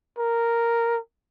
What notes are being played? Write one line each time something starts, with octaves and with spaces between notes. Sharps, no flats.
A#4